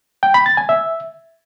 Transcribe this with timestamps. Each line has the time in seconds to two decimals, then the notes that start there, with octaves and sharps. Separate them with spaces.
0.23 G5
0.34 B5
0.46 A6
0.57 G#5
0.69 E5